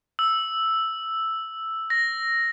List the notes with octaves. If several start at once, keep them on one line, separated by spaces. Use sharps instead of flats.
E6
A#6